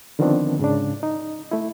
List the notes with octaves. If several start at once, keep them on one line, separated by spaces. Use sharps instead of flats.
D3 D#3 F3 B3 C4 D4
G#2 C#3 D4
D#4
A3 E4